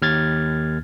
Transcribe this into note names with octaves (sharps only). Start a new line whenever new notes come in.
D#2 F6 G#6 A6